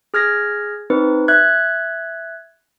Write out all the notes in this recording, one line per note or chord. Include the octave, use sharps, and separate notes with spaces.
G#4 F6 G#6 A#6
C4 D#4 B4
E5 F#6 G#6